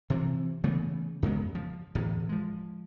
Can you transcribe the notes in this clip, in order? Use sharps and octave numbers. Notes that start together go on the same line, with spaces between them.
C3 E3 F3
C#3 E3 A3 B3
F2 C#3 G#3 B3
F3
D1 E2 A2
F3 G#3